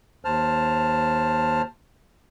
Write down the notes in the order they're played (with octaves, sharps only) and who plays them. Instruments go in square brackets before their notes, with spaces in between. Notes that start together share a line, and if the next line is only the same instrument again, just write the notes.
[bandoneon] D#2 C5 A5 F6